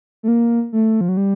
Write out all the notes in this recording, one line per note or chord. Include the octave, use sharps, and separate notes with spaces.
A3
A#3
A3
F3
F#3
G3